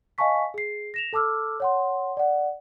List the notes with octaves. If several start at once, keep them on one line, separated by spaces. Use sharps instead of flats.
D#5 F5 G#5 A5 C#6 B6
G#4 C7
A#6 E7 F7
A4 A5 D6 E6 F6
C#5 F#5 C6
D5 F#5